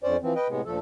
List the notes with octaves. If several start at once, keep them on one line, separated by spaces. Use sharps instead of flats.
F2 D3 C#4 C5 D5
E3 F3 C4
B4 D#5 G5
A2 C3 G#3 B3
D2 A#2 F3 A3 A4